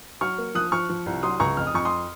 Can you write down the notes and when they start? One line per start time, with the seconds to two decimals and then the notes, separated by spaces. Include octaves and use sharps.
0.21 F#3 C#6 F6
0.38 A#3
0.55 F3 D#6 F#6
0.72 F3 C#6 F6
0.90 F3
1.06 C2
1.23 F#3 C6 D#6
1.40 C#2 A#5 C#6
1.57 F2 F6
1.67 D#6
1.74 F2 C#6
1.85 C6 D#6